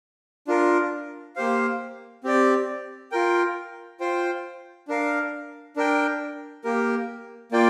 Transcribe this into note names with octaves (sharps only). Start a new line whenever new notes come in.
D4 F4 A#4
A#3 G4 C5 F5
C4 G4 D5
F4 A#4 G5
F4 C5 G5
D4 A#4 F5
D4 A#4 G5
A#3 G4 A#4
A#3 F4 D5 G5